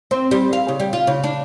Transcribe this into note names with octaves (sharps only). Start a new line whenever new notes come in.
C4
G3
F5
C#3
G3
F4
C#3
D4